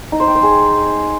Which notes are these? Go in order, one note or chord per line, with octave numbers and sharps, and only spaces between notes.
D#4
C5
G5
C5
G#4